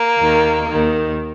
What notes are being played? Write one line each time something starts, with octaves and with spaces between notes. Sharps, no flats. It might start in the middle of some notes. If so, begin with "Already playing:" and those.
Already playing: A#3
D#2 D#3
D#2 D#3